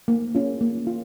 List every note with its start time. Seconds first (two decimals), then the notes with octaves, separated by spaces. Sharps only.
0.08 A#3
0.35 C#4 F4
0.61 A#3
0.87 F4